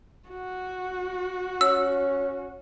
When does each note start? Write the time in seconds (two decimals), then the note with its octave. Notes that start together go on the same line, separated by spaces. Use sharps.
0.29 F#4
1.61 C#4 E6